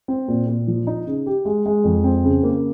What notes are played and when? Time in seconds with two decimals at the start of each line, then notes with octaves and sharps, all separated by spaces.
0.08 C4
0.28 A#2
0.47 A#2
0.67 F3
0.87 D#4
1.07 C#3
1.26 G4
1.45 G#3
1.66 G#3
1.84 F2
2.04 C4
2.24 C#3
2.43 A#3